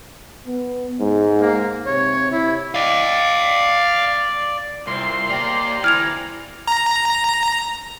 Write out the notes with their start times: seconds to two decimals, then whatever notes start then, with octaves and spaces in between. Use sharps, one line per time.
0.47 B3
1.01 G#2
1.41 A#3
1.86 C3 C#5
2.31 E4
2.75 D5 D#5 F5
4.87 C2 A#2 C4 C6
5.29 A#3 G4 C5 D5 A#5
5.84 D2 E3 F6 G#6 F7
6.67 A#5